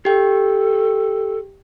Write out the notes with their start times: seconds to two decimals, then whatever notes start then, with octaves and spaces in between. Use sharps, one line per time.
0.05 G4 A4 G5